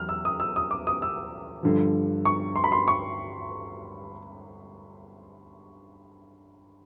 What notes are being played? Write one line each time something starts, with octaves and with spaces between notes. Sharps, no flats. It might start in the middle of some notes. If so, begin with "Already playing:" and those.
Already playing: E2 F#3 F6
E6
D#6
E6
D#6
D6
D#6
E6
G2 D3 F3
C#6
C6
B5
C6
C#6